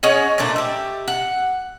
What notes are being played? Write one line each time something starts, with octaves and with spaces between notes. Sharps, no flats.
C#4 G#4 D#5 F#5
A#2 F3 A3 D4
G4 E5
F#5